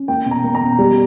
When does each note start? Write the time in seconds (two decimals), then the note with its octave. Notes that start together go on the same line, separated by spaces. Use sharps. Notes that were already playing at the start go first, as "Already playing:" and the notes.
Already playing: C#4
0.08 A#3 G5
0.26 B2
0.31 A#5
0.44 A#3
0.55 A#5
0.61 B2
0.79 G3